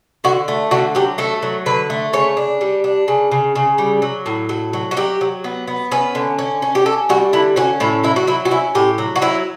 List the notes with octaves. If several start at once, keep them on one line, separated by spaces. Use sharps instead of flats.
D3 F#4
A3
D3 F#4
F#3 G4
A3 A4
F#3
D3 B4
A3
C#3 C#5
D4
G3
D4
C#3
C#3
C#3
G3
F#3
A2
F#3
F#3
F#4
F#3 G4
F#3
B3
B3
C#4 B4
D3
C#4
C#4
G4
C#4 A4
G3 F#4
D3 E4
C#4 F#4
A2 E4
F#3 E4
F#4
F#3 E4
F#4
C#4 E4
A2 G4
F#3
F#4
F#3 E4